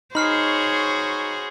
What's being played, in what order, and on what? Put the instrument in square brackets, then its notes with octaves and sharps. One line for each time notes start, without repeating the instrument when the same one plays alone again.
[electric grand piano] D#4 [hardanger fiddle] F#4 G#4 [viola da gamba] C5 C#5 [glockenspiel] B5 F6 C7